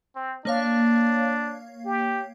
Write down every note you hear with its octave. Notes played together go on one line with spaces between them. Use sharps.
C4
A#3 D4 C#5 F5
G4